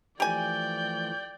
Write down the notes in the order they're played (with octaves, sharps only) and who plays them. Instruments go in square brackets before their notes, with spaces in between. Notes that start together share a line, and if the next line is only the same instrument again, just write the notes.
[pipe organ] E3 F3 A3 [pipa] G4 G#5 [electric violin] D5 G5 [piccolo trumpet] G6